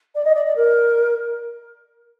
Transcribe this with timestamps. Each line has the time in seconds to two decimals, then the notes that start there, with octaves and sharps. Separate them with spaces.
0.15 D5
0.24 D#5
0.35 D5
0.45 D5
0.56 A#4